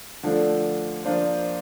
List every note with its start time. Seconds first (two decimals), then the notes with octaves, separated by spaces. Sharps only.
0.23 D3 F3 A3 D4
1.05 F3 A#3 D4 F4 C5